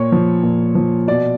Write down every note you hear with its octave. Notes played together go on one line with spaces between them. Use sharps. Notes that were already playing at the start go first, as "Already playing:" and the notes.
Already playing: A#2 C#5
F3
A#2
F3
B2 D5